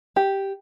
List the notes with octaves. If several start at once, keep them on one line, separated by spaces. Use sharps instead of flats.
G4